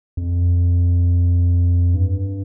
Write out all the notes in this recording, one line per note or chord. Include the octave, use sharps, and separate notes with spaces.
F2
G2